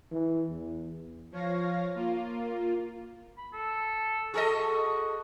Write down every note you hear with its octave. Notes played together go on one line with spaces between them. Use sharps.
E3
E2
F3 C#5 F5 A#6
A#3 F4
B5
A4
F#4 G#4 A4 D#5